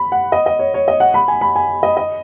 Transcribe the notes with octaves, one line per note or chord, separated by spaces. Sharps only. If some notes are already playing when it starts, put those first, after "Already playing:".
Already playing: B5
F#5
D#5
D#5
C#5
C#5
D#5
F#5
B5
G#5
B5
G#5
D#5
D#5